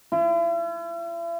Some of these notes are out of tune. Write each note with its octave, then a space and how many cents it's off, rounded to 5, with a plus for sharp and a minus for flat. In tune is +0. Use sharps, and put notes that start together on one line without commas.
E4 +45